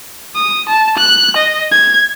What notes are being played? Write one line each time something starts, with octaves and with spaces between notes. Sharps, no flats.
D#6
A5
F#6
D#5
G#6